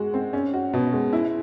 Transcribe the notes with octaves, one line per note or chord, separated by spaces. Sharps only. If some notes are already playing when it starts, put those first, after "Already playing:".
Already playing: G#3 F#4
C4
C#4
F#4
B2
G#3
E4